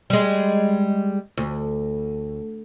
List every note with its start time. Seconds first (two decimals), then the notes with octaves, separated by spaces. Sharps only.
0.10 G3 G#3
1.37 D2